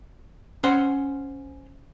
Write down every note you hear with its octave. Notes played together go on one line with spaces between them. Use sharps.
C#4 C5 F#5 C6